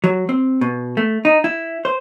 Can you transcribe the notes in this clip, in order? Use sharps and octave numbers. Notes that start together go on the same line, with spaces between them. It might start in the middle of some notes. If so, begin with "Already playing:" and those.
F#3
C4
B2
A3
D#4
E4
C5